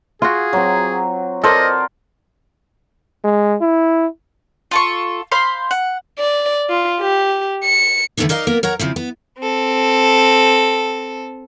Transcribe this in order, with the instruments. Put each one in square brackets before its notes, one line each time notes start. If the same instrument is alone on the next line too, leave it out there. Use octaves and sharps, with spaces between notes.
[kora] F4 F#4 [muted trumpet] G#4
[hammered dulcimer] F#3 C4
[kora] A4 [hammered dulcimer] A#4 C5 D5 [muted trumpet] D#5
[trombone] G#3
E4
[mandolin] F4 A4 C#6
C5 F5 B5 C6
F#5
[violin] D5
F4
G4
C#7
[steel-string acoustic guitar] D3 E3 A3 B3 D4 D#4
D#4 A#4 D5 D#5 F5
A#3 B3 A#4
A#4 C#5 F#5 A#5
C#3 F3 C4 E4
B3
[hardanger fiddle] C4 A4